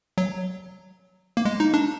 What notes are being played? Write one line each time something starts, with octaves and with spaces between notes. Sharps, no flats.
F#3
A#3
G#3
D#4
D4